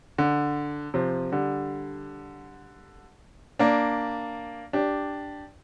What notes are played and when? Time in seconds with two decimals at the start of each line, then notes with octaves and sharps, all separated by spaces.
0.18 D3
0.94 C3 F3
1.32 D3 G3
3.59 A#3 D4
4.73 D4 G4